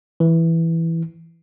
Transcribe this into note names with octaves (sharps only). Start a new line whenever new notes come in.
E3